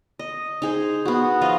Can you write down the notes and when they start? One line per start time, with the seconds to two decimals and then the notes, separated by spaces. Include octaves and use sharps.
0.19 D#5
0.62 D#4 G#4 C5
1.05 B3 F#4
1.41 F3 F4 D#5